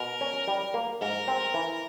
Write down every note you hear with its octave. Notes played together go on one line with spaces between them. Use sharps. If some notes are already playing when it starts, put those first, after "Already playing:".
Already playing: B2 A#4
C#4
G3
A#3
G#2 A#4
C4
E3